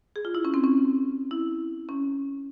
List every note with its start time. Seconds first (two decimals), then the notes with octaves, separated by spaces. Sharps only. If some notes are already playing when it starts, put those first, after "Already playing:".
0.16 G#4
0.25 F4
0.35 E4
0.45 C#4
0.54 C4
0.64 C#4
1.31 E4
1.89 C#4